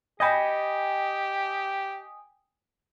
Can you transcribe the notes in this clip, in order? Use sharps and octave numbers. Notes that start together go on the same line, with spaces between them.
G4 D#5 G5 G#5 B5 D#6